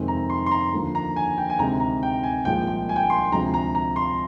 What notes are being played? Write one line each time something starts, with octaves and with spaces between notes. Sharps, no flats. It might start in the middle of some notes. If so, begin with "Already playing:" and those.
Already playing: F2 C3 D#3 G#3 C4
A#5
C6
C6
A#5
D#2 D3 F3
A#5
G#5
G5
G#5
D2 C3 D#3 G#3 A#5
A#5
G5
G#5
C2 A#2 F3 G#3 G5
G5
G#5
G5
G#5
C6
D2 C3 F3 G#3 A#5
A#5
A#5
C6